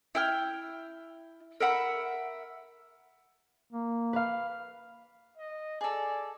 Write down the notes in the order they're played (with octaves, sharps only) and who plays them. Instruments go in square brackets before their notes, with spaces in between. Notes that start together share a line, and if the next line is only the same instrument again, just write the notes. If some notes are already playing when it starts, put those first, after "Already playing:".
[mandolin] E4 G5 F6
A#4 E5 F#5 B5
[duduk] A#3
[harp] B4 F5
[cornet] D#5
[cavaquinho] G#4 A4 [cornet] D5